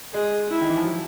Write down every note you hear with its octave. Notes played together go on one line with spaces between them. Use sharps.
G#3 G#4
E4
D#3
E3
F3
F#3